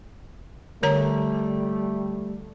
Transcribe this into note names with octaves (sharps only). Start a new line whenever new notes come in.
D3 G3 A3 C#5 A#5